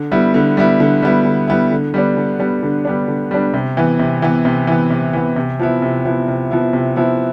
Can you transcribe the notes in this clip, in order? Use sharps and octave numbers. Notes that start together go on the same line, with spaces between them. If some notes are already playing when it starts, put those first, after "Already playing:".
Already playing: D3
G3 B3 E4
D3
G3 B3 E4
D3
G3 B3 E4
D3
G3 B3 E4
D3
G3 B3 D4
D3
G3 B3 D4
D3
G3 B3 D4
D3
G3 B3 D4
C3
E3 B3
C3
E3 B3
C3
E3 B3
C3
E3 B3
C3
F3 B3 E4
C3
F3 B3 E4
C3
F3 B3 E4
C3
F3 B3 E4